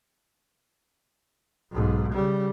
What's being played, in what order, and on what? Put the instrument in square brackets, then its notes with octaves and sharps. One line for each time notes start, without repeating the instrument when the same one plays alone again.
[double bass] B1 G#2
C#3 G3